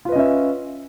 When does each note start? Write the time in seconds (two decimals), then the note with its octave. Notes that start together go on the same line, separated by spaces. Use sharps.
0.05 F4
0.09 B4
0.12 D#5
0.16 C#4
0.19 E5